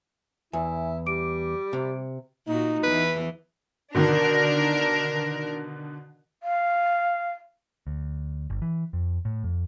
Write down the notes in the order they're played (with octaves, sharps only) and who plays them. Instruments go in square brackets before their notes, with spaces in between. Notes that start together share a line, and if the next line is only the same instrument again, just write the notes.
[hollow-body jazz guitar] E2 [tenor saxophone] E4 [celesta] G#5
[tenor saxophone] G3 [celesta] D6 D7
[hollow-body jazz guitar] C3
[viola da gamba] A#2 F#4 [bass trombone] D#4
[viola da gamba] E2 E3 [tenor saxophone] B4
[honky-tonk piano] B2 D3 D#3 [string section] D4 A#4
[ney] F5
[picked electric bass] D2
G1
E3
F2
A2
F2